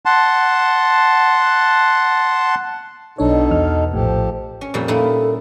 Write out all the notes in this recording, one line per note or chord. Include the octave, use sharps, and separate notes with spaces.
F#5 A5 C6
B1 B2 D4 D#4 A4 C#5
E2 F6
A#1 A2 F3 G4 A4
C#4
F2 A#2 G3
A#2 D#4 E4 A4